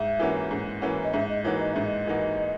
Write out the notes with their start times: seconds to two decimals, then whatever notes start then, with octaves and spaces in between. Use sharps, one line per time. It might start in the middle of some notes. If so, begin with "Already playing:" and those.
Already playing: G#2 E5
0.19 E3 A#3 C#4 F#4
0.51 G#2
0.82 E3 A#3 C#4 F#4
1.04 D#5
1.13 G#2 E5
1.29 D#5
1.44 E3 A#3 D#4 F#4 C#5
1.60 D#5
1.73 G#2 E5
1.86 D#5
2.07 E3 A#3 D#4 F#4